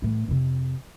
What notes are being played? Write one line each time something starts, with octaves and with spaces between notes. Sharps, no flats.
A2 E3
F2 C3